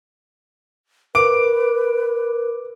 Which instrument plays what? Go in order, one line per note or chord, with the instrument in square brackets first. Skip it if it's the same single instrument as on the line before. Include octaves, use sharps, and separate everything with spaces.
[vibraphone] A#4 [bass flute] B4 [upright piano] D6 D7